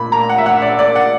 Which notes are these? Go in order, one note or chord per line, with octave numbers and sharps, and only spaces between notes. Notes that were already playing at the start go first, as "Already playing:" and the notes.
Already playing: A#2 A#3 B5
A#3 A#5
F#5
E5
A#1 F#5
D5
A#3 D5
F#5